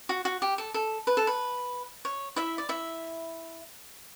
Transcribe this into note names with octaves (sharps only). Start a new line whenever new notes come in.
F#4
F#4
G4
A4
A4
B4
A4
B4
C#5
E4 E5
D5
E4 E5